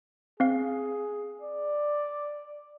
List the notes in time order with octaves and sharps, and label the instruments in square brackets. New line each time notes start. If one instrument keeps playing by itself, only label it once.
[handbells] C4 F5 [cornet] G#4
[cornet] D5